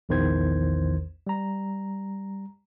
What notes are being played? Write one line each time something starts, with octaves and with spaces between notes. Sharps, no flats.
A#1 E2 D#3 E3 C5 G#6
G3 A#5